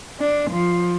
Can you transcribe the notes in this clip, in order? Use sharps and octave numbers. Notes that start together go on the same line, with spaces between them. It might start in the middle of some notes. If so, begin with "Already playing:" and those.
D4
F3